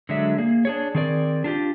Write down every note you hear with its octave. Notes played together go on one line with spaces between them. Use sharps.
D3 F#3 G#3 D5 E5
A#3 G#4
D4 G#4 C#5
D#3 C4 G#4 A#4 D5
D4 F4 G4